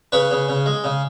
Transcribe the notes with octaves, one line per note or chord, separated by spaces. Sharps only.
C#3 B4 C#5
C#3
C#3
G#3
C#3